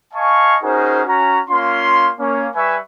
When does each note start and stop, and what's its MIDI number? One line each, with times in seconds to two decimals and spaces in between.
0.14 0.56 75
0.14 0.56 77
0.14 0.56 80
0.14 0.56 81
0.14 0.56 85
0.62 1.02 61
0.62 1.02 63
0.62 1.02 66
0.62 1.02 68
0.62 1.02 70
0.62 1.02 72
1.06 1.39 61
1.06 1.39 66
1.06 1.39 82
1.49 2.10 58
1.49 2.10 61
1.49 2.10 65
1.49 2.10 84
2.19 2.47 58
2.19 2.47 61
2.55 2.76 55
2.55 2.76 71
2.55 2.76 76
2.55 2.76 80
2.55 2.76 85